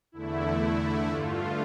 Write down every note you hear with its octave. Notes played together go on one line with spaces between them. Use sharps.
E2 D3 A3 E4
G2 D3 A3 F4